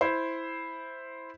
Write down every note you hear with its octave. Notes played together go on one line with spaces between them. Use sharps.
E4 C5